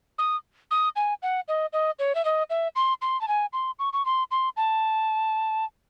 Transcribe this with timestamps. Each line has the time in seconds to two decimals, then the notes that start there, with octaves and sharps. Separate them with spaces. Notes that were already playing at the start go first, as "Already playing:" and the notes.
0.18 D#6
0.71 D#6
0.96 G#5
1.22 F#5
1.48 D#5
1.73 D#5
1.99 C#5
2.15 E5
2.25 D#5
2.50 E5
2.76 C6
3.02 C6
3.21 A5
3.28 G#5
3.53 C6
3.79 C#6
3.93 C#6
4.06 C6
4.31 C6
4.57 A5